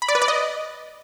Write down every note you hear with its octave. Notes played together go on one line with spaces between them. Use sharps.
B5
D5
B4
D5
D#5